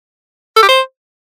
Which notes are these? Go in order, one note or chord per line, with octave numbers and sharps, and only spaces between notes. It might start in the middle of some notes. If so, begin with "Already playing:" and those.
A4
G4
C5